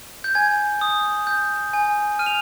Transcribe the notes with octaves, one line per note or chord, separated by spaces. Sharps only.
G6
G#5 G#6
D#6
G6
G#5
F6 D#7
F7